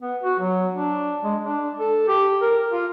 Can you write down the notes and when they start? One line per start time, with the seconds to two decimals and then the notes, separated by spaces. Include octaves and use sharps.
0.01 B3
0.23 F#4
0.40 F#3
0.73 D4
1.23 G#3
1.43 D4
1.79 A4
2.08 G4
2.41 A#4
2.71 F4